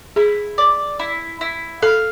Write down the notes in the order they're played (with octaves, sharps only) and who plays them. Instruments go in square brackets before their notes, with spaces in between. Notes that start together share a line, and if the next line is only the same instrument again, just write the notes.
[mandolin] E4 [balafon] G#4
[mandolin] D5
E4
E4
[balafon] A4 [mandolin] F5